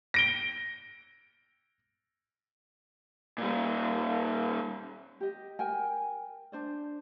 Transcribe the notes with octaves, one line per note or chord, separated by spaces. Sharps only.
A#6 D7 G7
A#2 G3
G4 D#5
A#4 G5 G#5
D4 C5 D5